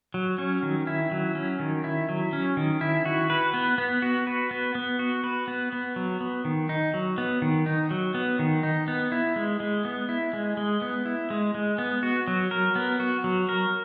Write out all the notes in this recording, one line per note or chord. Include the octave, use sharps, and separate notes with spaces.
F#3
C#4
D#3
E4
F#3
C#4
D#3
E4
F#3
C#4
D#3
E4
F#4
B4
B3
B3
F#4
B4
B3
B3
F#4
B4
B3
B3
F#3
B3
D#3
D#4
F#3
B3
D#3
D#4
F#3
B3
D#3
D#4
B3
E4
G#3
G#3
B3
E4
G#3
G#3
B3
E4
G#3
G#3
B3
F#4
F#3
A#4
B3
F#4
F#3
A#4